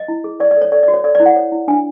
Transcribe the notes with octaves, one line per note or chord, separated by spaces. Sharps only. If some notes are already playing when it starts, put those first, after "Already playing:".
Already playing: D#5
E4
G#4
C#5 D5
D5
A4
C#5
A4 D5
D5
F#4
C#5
A4 D5
D5
E4
F#5
C#5
E4
D4 G#5